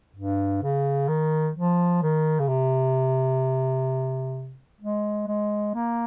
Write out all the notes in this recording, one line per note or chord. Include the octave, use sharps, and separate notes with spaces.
G2
C#3
D#3
F3
D#3
C#3
C3
G#3
G#3
A#3